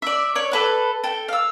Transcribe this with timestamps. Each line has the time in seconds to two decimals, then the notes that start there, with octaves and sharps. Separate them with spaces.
0.02 D5 E5
0.35 C#5 D5
0.52 A4 B4 F#5
1.04 A4 G5
1.28 F5 E6